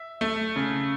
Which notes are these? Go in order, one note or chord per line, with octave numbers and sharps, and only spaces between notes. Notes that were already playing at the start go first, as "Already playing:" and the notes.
Already playing: E5
A3
C#3